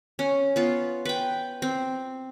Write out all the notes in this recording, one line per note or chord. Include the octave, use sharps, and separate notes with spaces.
C#4
B3 F4
B4 G5
C4